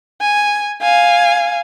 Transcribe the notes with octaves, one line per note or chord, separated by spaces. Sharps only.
G#5
F5 G#5